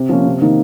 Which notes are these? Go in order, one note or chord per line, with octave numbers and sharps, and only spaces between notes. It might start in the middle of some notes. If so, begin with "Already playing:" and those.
Already playing: C3
F3 A#3 C#4
C3
D#3 A#3 D#4